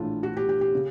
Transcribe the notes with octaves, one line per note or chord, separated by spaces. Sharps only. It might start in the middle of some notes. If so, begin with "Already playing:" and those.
Already playing: A#1 A2 E3 A3 D4 F4
F#4
G4
G4
G4
C#3